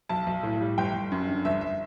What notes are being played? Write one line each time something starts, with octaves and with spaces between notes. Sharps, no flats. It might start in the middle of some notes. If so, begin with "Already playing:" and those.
B1 A5
B1
A2
G3
G1 G5
G1
F#2
D3
G1 E5
E5